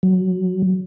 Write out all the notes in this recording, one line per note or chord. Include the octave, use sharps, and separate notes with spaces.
F#3